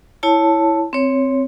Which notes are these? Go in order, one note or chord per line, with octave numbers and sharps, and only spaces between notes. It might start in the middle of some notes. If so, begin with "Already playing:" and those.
E4 C#5 A5
C4 C#5